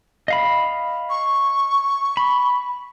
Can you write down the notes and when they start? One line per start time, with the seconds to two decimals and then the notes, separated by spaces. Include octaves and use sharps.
0.28 D#5 F5 B5
1.10 C#6
2.17 B5